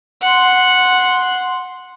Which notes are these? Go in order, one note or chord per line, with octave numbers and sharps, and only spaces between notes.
F#5 C6